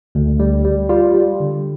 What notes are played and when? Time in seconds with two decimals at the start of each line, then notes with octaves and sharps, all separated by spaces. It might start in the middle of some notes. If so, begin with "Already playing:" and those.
0.15 D2
0.40 G3
0.64 G3
0.89 G3 F4
1.14 G3
1.40 D3